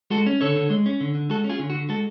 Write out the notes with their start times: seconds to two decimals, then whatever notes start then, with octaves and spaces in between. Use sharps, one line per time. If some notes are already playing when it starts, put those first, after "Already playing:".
0.10 G#3 F#4 A4
0.26 C#4
0.41 D3 A4 C#5
0.56 D3
0.70 G#3
0.86 C#4
1.01 D3
1.15 D3
1.30 G#3 F#4 A4
1.44 C#4
1.49 F4 G#4
1.59 D3
1.70 F#4
1.74 D3
1.89 G#3 F#4 A4